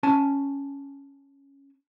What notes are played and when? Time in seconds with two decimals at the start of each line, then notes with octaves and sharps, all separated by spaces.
0.03 C#4 G#5 A5